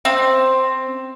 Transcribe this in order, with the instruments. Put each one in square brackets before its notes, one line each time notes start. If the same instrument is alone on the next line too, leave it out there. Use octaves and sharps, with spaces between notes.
[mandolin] C4